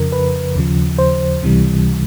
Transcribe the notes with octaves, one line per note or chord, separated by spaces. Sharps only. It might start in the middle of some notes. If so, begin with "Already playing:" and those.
Already playing: F2 C#3 F3 A#4
B4
D#2 C#3 F3
C5
C#2 C3 E3 G3